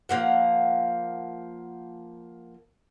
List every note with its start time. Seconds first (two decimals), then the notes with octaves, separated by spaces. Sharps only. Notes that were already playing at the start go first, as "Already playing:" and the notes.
0.09 F3 A#3 F#5